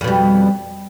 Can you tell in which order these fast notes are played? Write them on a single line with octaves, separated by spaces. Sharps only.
F2 B2 G3